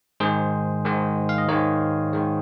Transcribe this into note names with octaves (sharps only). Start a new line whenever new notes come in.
G#2 D#3 G#3 G#4 C5
G#2 D#3 G#3
F5
D#5
G#2 D#3 G#3 A#4 C#5
G#2 D#3 G#3